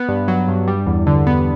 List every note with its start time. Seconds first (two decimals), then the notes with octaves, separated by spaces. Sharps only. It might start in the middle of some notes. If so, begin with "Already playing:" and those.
Already playing: B3
0.09 G2
0.28 F#3
0.48 G2
0.68 G3
0.87 E2
1.07 D3
1.27 B3